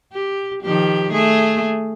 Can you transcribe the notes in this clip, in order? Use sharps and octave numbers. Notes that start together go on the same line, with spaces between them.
G4
D#3 F3 G4
A3 G#4